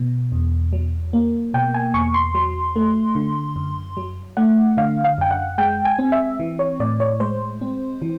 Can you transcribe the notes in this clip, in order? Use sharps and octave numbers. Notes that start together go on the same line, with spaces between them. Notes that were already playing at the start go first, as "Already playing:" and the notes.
Already playing: B2
E2
F#3
A#3
B2 G5
G#5
E2 C#6
C6
F#3
A3
D3
F#2
F#3
A3 F#5
D3 F5
F5
F#2 G5
F#5
G#3 G5
G#5
C4
E5
E3
C#5
A2 D5
C#5
G#3 C5
C4
E3